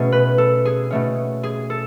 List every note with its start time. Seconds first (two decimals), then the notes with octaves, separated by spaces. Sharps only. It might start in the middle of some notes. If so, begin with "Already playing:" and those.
Already playing: B2 A3 C#4 G#4
0.12 B4
0.38 A4
0.65 G#4
0.91 B2 A3 C#4
1.43 G#4
1.70 A4